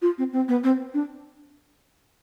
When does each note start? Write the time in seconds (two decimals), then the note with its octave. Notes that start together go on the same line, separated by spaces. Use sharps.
0.02 F4
0.18 C4
0.33 C4
0.48 B3
0.63 C4
0.94 D4